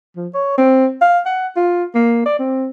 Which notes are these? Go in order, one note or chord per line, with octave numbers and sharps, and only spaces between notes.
F3
C#5
C4
F5
F#5
F4
A#3
D5
C4